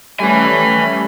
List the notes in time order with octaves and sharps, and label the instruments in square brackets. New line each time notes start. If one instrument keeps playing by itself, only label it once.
[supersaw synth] G3 A3 C#4 [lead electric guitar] B4 G#5 [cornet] B5